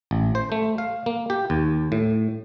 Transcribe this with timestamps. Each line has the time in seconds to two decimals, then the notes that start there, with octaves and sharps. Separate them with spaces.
0.11 A1
0.35 C5
0.52 A3
0.78 F5
1.06 A#3
1.30 G4
1.50 D#2
1.92 A2